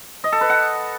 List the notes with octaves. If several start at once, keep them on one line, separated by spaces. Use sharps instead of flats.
D#5
A4
B4
F#5